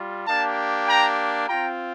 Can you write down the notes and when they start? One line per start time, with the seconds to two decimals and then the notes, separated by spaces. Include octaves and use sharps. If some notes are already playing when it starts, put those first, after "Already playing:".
Already playing: G3 F4
0.26 A#3 D4 G4 F5 A5
0.87 G5 A#5
1.48 C4 F4 G5 A#5